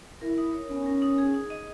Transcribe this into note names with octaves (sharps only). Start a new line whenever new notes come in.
E4 A#4
D#4
C#5
B3 C#4
A#4
D#4
G#4
D#4
D#5